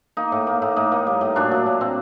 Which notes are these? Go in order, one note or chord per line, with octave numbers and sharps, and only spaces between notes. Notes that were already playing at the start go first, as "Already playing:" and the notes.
A#3 D#4
A2
A#3
A2
A2 D#4
A#3
G3
A2
A#2 D4 F#4
F#3
A#2
C4